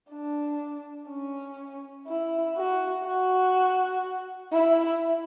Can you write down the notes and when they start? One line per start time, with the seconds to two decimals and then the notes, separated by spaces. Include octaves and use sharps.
0.11 D4
1.08 C#4
2.07 E4
2.56 F#4
3.05 F#4
4.52 E4